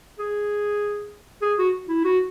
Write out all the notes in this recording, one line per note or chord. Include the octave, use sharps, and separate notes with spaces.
G#4
G#4
F#4
E4
F#4